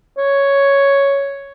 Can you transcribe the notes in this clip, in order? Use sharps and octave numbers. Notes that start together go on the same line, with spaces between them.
C#5